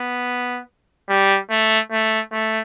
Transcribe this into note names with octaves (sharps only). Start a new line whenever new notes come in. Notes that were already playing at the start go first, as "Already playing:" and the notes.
Already playing: B3
G3
A3
A3
A3